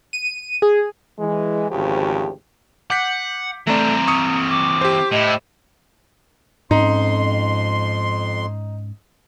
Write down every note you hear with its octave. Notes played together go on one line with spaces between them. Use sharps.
D#7
G#4
E3 G#3
G#1 D2 C#3 F3 G4
F#5 D6 G6 B6
E3 A3 C4 D5 A#5
C#6 D#6 C#7
D6
G4 C5
A2 E4 D#5
F2 G#2 C#4 D#4 C6